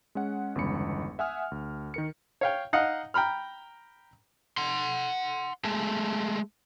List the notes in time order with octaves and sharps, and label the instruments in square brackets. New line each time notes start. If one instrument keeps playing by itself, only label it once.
[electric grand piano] G#3 C#4 F#5
G1 E2 C#3 G#3 B5 C#7
E5 F#5 G#5 D#6 F6
D2
D#3 A#4 C#7
[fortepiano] C#5 F5 G5
D#4 D#5 F5 F#5
G5 A#5 B5 F6
[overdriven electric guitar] F#5 C6
G#3 A3